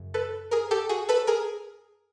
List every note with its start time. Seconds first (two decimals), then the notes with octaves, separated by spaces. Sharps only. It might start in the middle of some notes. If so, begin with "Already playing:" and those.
Already playing: F#2 C#3
0.14 A4 B4
0.51 G#4 A#4
0.71 G4 A4
0.89 F#4 G#4
1.09 A4 B4
1.27 G#4 A#4